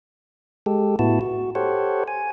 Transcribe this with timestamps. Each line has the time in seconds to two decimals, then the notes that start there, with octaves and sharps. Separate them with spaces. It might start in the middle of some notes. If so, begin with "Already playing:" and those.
0.66 G#3 G4 A4
0.99 A2 B3 E4 F#4 A5
1.21 F#4
1.55 G4 A4 C5 C#5 F#5
2.08 G#5